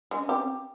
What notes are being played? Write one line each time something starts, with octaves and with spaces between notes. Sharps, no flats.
G#3
C#4
C4 G4